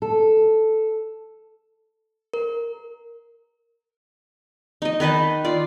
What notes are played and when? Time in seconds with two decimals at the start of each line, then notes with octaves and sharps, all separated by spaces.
0.02 A4
2.34 A#4
4.82 D#4 D#5
5.00 D#3 B4 D#5 A5
5.45 F4 D5